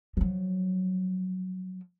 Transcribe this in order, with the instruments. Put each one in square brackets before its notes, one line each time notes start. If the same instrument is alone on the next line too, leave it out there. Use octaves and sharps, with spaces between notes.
[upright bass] F3 F#3